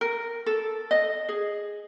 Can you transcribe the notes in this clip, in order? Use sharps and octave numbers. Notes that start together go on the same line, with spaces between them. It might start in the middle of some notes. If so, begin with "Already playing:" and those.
A#4
A4
D#5
G#4